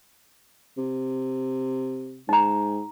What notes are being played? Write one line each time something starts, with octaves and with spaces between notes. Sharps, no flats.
C3
G#2 D#4 A#5